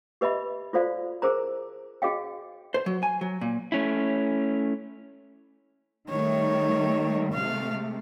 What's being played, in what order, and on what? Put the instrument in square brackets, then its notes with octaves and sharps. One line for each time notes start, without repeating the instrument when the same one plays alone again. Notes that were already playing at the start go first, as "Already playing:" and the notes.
[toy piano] G4 B4 D#5 E5 B5
F4 F#4 A4 C5 D5 F5
G#4 A#4 C5 A#5
F#4 G#4 D#5 F5 G5
[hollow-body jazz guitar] C5
F#3
G#5
F#3
A#2
[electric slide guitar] A3 C#4 E4
[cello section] D#3 G3 A3 [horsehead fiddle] C#5
[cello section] C3 G#3 A3 [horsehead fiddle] F5